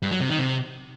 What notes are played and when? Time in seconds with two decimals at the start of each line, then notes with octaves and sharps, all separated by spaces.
0.02 G2
0.11 F#3
0.20 C3
0.29 D#3
0.38 C3